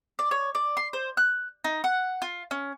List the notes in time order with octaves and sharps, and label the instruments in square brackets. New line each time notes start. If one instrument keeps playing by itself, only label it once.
[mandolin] D5
C#5
D5
C6
C5
F#6
D#4
F#5
F4
C#4